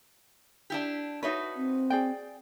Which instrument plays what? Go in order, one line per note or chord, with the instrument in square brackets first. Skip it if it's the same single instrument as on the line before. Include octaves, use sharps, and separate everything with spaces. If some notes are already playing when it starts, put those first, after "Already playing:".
[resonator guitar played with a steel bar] D4 E4 G4
[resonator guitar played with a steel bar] D#4 F#4 B4 [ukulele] C#5 E5
[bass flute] C4
[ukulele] G#4 D5 G5